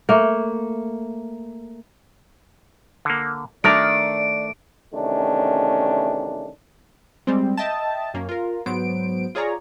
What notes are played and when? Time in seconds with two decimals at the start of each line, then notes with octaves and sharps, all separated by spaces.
0.09 A3 A#3
3.05 D3 A#3
3.64 D#3 A3 D4 A#4 D5 D7
4.94 E2 C3 D#3 A3 C#4 D4
7.27 G3 G#3 C4
7.57 D#5 E5 G5 A5
8.14 F#2 A#3 C#4
8.29 F4 A#4
8.66 G#2 F#3 B3 C5 D7
9.35 F4 G#4 C#5 D5 A#5